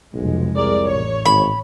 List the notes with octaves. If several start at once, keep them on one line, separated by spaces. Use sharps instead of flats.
F1 B1 G#3
C2 G#4 A#4 D5
A1 C#5
G#1 B5